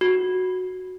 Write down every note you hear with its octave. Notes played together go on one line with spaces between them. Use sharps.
F#4